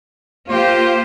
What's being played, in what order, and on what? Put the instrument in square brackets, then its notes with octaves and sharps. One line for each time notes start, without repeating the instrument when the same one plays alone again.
[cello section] A#3 F4 G4 [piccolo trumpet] C5